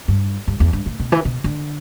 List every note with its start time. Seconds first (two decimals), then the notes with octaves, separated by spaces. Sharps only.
0.08 G2
0.47 G2
0.60 E2
0.73 G2
0.86 A2
1.00 B2
1.12 E3
1.25 B2
1.44 D3